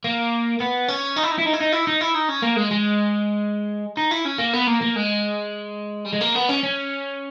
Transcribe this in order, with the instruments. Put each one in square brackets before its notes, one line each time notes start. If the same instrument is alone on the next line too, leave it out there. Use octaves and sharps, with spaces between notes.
[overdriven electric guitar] A#3
B3
C#4
D#4
E4
D#4
E4
D#4
E4
D#4
E4
D#4
E4
D#4
C#4
A#3
G#3
G#3
D#4
E4
C#4
A#3
B3
A#3
A#3
G#3
G3
G#3
A#3
B3
C#4
C#4